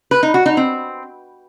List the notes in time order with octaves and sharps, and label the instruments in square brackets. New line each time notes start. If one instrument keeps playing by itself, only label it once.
[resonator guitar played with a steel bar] B4
D#4
F#4
D#4
C4